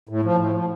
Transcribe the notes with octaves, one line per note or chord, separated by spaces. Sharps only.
A2
F3
A2
F3